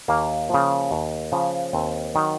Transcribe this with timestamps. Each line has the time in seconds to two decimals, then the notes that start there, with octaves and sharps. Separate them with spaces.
0.08 D#2 A#3
0.49 C#3 F3
0.91 D#2
1.32 C#3 F3
1.73 D#2 C4
2.15 D#3 F#3